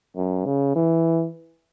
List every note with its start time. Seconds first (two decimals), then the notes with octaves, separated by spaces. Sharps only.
0.16 F#2
0.46 C#3
0.75 E3